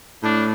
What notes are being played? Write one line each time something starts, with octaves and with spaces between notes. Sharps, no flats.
A2 D4